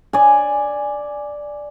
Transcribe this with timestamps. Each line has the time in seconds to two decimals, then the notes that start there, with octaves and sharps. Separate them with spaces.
0.13 D5 G#5